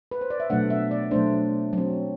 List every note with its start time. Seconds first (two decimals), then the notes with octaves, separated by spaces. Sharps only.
0.11 B4
0.21 C5
0.30 D5
0.40 E5
0.50 B2 F#3 A3 D4 F#5
0.70 E5
0.91 D5
1.11 B2 F#3 A3 D4 C5
1.73 F#3 C4